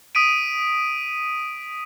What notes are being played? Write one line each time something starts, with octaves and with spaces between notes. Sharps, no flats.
D#6 B6 D7 D#7